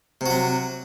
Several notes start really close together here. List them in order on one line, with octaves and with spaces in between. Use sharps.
C3 F#4 F#3